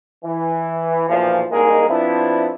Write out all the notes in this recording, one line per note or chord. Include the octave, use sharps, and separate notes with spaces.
E3
B1 E2 A#2 F3
C2 G#3 A#3 D#4 G#4 A#4
F3 B3 C4 D4 E4